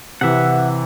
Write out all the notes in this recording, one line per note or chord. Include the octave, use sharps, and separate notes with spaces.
C3 E3 E5 F#5